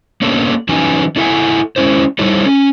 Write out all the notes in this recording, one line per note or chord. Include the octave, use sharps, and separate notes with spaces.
A#3 B3 C#4 D4 A4
E3 F#3 C#4 D#4 B4 G#5
D4 E4 A4 E5 F#5 G#5
G#3 C#4 E4 C5
G3 D#4 E4 A4 C5 C#5
C#4